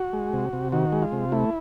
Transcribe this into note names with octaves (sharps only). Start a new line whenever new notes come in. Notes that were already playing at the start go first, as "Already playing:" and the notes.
Already playing: F#4
G#3
C3
C3
D#3 F#4
G#3
F4
C3
A3 E4